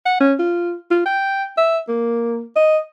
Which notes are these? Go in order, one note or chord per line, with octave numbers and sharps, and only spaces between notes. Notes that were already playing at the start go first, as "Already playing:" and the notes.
F#5
C#4
F4
F4
G5
E5
A#3
D#5